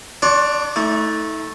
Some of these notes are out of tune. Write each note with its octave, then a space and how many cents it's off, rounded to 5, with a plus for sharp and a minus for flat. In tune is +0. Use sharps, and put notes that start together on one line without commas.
D4 +10 D5 -40 C6 +35
A3 -5 D#4 +45